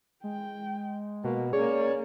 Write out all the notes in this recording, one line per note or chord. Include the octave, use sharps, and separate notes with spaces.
G#3 G5
B2 A#3
A#3 C#4 G#4 C#5 D5